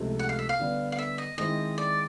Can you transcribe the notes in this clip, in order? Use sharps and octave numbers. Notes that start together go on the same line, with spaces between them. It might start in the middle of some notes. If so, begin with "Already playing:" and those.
Already playing: C#2 C3 F3 A3
F#5
F5
E5
F5
D3 G3 B3 D4
F5
E5
D#5
D#3 G#3 C4 E4 D#5
D5